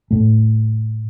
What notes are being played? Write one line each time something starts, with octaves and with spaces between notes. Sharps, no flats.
A2 A3